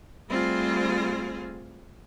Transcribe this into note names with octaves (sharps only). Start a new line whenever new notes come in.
G3 A3 C4 F4 G#4 C5